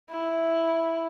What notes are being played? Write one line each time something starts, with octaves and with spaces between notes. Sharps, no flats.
E4